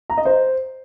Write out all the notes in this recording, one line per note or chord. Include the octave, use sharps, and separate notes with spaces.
A#5
D#5
C5